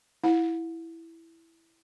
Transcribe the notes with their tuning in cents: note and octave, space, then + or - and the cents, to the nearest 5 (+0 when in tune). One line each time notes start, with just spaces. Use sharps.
E4 +0 F#5 -40